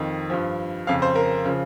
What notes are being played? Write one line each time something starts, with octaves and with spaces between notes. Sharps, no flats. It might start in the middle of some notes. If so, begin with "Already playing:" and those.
Already playing: F2 D#3 D#5
G2 F3
F2 C#3 F3 F5
C5
A#4
C#3 F3